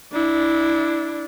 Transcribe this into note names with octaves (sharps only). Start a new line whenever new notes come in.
D4 E4